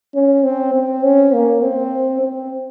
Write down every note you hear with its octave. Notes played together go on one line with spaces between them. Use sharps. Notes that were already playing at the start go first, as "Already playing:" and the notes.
C#4
C4
C4
C#4
A#3
C4
C4